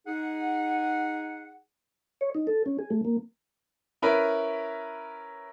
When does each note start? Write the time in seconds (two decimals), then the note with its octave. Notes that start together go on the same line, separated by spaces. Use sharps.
0.07 D#4 G#4 F#5
2.21 C#5
2.35 D#4
2.47 A4
2.66 C#4
2.79 G#4
2.90 A3
3.05 A#3
4.02 C#4 E4 A#4 B4